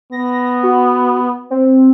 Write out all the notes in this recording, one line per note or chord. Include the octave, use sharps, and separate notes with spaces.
B3 A#6
F#4
C4